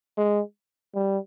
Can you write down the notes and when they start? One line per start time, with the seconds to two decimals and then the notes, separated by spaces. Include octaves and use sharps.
0.18 G#3
0.95 G3